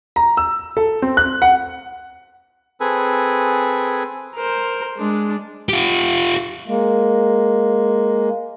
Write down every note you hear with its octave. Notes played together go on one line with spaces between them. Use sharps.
A#5
E6
A4
C4
F#6
F#5
C4 G#4 A4 B4 G#5
A#4 C5
G#3 D4
F4 G4
G#3 A#3